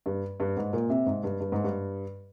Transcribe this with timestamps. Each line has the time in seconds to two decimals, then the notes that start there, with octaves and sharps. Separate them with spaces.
0.06 G2
0.40 G2
0.57 G#2
0.73 A#2
0.90 C3
1.06 G#2
1.24 G2
1.40 G2
1.52 G#2
1.64 G2